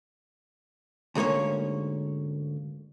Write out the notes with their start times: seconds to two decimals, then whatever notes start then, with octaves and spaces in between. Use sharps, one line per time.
1.15 D2 G#2 A#3 C#4 C#5